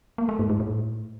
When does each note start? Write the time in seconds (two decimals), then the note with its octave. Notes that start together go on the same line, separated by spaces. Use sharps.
0.18 A#3
0.29 A3
0.39 G#2
0.50 G#2
0.60 A2